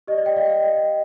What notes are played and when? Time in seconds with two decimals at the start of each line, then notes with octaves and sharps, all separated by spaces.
0.07 G4 D5 D#5
0.18 D5
0.26 D#5 G5
0.36 D5 F5
0.45 G5
0.50 D5 F5
0.64 D#5